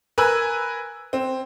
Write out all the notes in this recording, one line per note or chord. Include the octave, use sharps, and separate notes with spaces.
A#4 B4 G#5 E6 F#6
C4